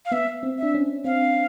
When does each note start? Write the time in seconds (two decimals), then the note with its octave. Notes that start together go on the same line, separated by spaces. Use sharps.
0.05 F5
0.12 B3 E5
0.43 C4
0.58 D4 E5
0.75 C#4
1.05 C4 F5